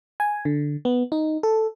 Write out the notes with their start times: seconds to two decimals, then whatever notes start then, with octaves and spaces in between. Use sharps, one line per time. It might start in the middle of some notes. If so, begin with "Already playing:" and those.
0.20 G#5
0.45 D3
0.85 B3
1.12 D#4
1.43 A4